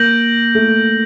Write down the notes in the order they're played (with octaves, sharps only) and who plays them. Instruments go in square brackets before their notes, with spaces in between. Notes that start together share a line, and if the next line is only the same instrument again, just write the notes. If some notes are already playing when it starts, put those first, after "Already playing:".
Already playing: [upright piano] A#3 [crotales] G6 A#6 D7 F#7
[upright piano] A3